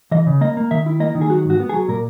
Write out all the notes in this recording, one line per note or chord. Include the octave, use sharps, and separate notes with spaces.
E3 D#5
C#3
A#3 D#5
A#3
D#3 E5
E4
A#3 D#5
D#3
G#4
F#3 F#4
G#2 F#4
B3
G#4
F#3
A#2 A#4